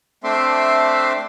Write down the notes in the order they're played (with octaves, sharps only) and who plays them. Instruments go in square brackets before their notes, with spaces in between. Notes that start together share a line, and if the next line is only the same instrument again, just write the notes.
[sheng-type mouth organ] A3 C4 D4 E5 C6 D6